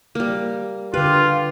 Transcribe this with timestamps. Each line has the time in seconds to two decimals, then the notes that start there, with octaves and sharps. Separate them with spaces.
0.15 G3 A#3
0.94 D3 F4 G4 B4